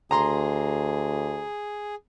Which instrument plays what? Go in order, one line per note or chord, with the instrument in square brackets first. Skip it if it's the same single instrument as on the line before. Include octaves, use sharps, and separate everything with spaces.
[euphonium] D2 [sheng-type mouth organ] G#4 [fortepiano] A#5 C6